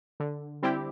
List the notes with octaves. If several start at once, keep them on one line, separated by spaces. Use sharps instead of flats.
D3
G3 C4 E4 G4